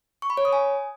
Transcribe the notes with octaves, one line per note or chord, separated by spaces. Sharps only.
C#6
B5
C#5
D#6
G#5